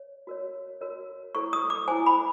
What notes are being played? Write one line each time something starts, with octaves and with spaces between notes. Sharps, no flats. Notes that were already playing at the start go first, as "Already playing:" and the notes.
Already playing: C#5
F#4 A#4 C#5
F#4 A#4 C#5
E4 A4 C5 C#6
D#6
D6
E4 A4 C5 G#5
B5